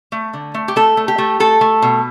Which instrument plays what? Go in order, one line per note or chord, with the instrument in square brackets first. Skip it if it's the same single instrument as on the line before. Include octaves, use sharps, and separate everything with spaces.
[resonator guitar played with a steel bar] A3
D3
A3
G4
A3 A4
A3
G4
A3
A3 A4
A3
B2